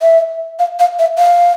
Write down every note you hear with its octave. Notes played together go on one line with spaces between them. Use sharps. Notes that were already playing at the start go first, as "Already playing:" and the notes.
E5
F5
F5
E5
F5